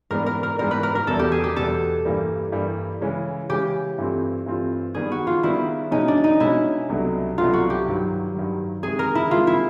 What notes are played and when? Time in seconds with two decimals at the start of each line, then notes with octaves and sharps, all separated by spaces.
0.11 G#2 E3 G3 B3 D4 A#4
0.26 A#4
0.43 A#4
0.58 G#2 E3 G3 B3 D4 A#4
0.71 B4
0.83 A#4
0.95 A#4
1.07 E2 B2 G3 A4
1.19 G4
1.32 G#4
1.44 G4
1.56 E2 B2 G3 A4
2.05 G2 E3 G3 A#3
2.52 G2 E3 G3 A#3
3.01 C#3 E3 G#3 C#4
3.49 C#3 E3 G#3 C#4 G4
3.98 G2 E3 A3 C4 F4
4.46 G2 E3 A3 C4 F4
4.94 D#3 G3 B3 G#4
5.12 F#4
5.27 F4
5.43 D#3 G3 B3 E4
5.91 B2 G#3 C#4 D#4
6.08 D4
6.24 D#4
6.40 B2 G#3 C#4 E4
6.89 C2 B2 F#3 A3 D4
7.37 C2 B2 F#3 A3 D4 F4
7.53 F#4
7.70 G4
7.86 G2 D#3 F#3
8.34 G2 D#3 F#3
8.83 C3 D#3 G#3 G#4
8.99 A#4
9.15 E4
9.31 C3 D#3 G#3 F4
9.47 E4